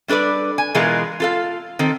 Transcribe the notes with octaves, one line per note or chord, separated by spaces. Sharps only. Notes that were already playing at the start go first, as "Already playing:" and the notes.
G3 D4 A4 B4 D5
G#5
B2 E3 G#3 F4 G#4 A#4
F4 A4 F5
D#3 C4 A4